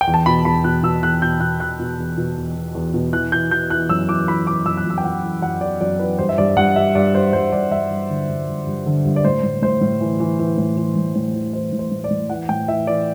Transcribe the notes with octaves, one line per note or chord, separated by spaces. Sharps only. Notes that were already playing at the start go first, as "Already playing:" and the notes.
G5
E2
A5
B2 B5
E2 B5
B2 F#6
B2 E6
E2 F#6
B2 G6
B2 F#6
E2 F#6
B2
E2
B2
E2
E2
E2
B2
E3 F#6
E3 G6
E3 G6
E3 F#6
F#2 E6
E3 D6
E3 B5
E3 D6
F#2 E6
F#6
F#2 E6
G5
F#2 F#5
E3
F#2 F#5
E3 D5
F#2 D5
E3 B4
G2 C5
E5
G2 D5
G2 F#5
G2 E5
G2 D5
G2 C5
G2 C5
G2 D5
G2 E5
G2
D3
G2
G2
G2
D3
G2
D5
A2 C5
A2
A2 C5
A2
E3
E3
E3
A2
E3
A2
A2
E3
E3 C5
A2
C5
A2
D5
A2
E3 F#5
A2 G5
E3 E5
E3 D5